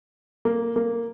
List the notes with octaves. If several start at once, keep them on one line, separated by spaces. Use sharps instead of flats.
A#3
A#3